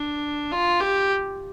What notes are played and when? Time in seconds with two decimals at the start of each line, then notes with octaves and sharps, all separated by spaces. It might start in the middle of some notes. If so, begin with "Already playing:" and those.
Already playing: D4
0.52 F4
0.80 G4